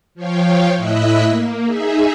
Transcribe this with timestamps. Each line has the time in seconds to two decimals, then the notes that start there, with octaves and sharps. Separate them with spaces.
0.15 F3 C#5 F5 G5
0.76 A2 E4 D#5 E5 E6 F#6
1.27 A#3
1.65 D#4 G#4 E5